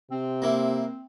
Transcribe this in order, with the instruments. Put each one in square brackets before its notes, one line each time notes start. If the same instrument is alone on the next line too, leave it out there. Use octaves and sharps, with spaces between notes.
[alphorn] C3 [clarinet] C4
[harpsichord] A#3 E4